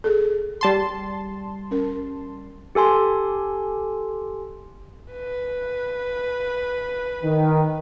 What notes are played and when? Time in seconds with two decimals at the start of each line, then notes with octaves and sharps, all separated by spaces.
0.04 G#4 A4
0.61 G3 A5 C6
1.71 C#4 A#4
2.75 G4 A4 G#5 C6
5.12 B4
7.24 D#3